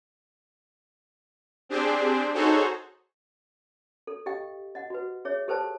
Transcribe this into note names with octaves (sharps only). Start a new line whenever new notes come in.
C4 D4 G4 G#4 C5
D#4 F#4 G#4 A4 C5 C#5
A4
G4 D#5 F5 G5
D#5 F#5
F#4 B4
G#4 C#5 E5
G4 A4 B4 C5 G5 A5